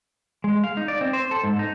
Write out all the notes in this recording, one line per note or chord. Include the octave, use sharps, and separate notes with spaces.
G#3
F5
D#4
D5
C4
C5
A4
G#2
D#4